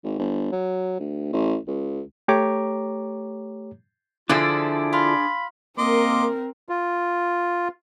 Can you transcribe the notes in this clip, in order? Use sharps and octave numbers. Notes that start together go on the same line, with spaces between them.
G#1
G1
F#3
D2
A1
C#2
A3 G4 C#5 A#5 D6
D3 F3 D4 E4 F4 G#4 D5
F4 B5
A#3 C4 A#4 D#5 C6 D6
F4